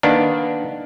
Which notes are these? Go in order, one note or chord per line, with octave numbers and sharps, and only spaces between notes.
D#3 A#3 B3 D4